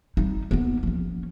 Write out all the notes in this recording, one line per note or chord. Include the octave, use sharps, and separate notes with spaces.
G3 D#4
A#3 B3
F3 C#4